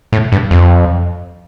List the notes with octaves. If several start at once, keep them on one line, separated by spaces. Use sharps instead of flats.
A2
G2
F2